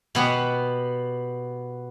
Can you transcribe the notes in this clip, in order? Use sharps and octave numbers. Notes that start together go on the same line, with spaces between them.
B2 B3 G4